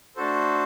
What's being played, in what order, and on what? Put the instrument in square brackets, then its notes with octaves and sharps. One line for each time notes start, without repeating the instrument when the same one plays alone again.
[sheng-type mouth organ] A3 D4 F#4 A4 C5